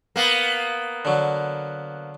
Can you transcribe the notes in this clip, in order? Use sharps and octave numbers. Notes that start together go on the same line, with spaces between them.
A#3 B3
D3 F#3